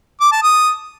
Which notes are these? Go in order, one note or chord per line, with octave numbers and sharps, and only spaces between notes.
D6
A5
D#6